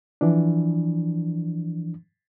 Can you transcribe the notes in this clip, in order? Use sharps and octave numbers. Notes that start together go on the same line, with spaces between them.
E3 F3 D4